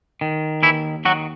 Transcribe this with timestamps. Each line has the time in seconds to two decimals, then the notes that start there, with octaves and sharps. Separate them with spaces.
0.21 D#3
0.63 D#2 E3 E4
1.05 D#3 F#3 F#4